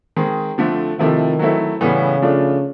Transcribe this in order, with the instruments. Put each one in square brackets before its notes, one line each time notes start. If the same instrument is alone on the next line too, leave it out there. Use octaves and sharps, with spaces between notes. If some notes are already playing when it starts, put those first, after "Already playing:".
[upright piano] D#3 G#3 C4
D3 F3 A3 C4
[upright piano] C3 F3 A3 C4 E4 [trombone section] D#3
[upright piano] F#3 A3 C4 E4
[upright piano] A2 E3 G3 B3 [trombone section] C#3
[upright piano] F3 A3 D4 F4